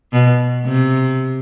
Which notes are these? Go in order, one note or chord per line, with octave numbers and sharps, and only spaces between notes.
B2
C3